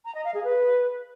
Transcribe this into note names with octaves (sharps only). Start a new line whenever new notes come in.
A#5
D#5
F5
G#4
B4